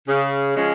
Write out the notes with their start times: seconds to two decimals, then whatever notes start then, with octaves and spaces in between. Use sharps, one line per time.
0.08 C#3
0.56 F3 G#3 C#4